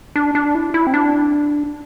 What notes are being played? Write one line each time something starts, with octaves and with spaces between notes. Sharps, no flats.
D4
D4
E4
E4
C4
D4